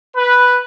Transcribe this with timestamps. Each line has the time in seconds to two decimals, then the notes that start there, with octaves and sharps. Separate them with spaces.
0.16 B4